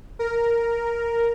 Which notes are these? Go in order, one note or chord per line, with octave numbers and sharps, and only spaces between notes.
A#4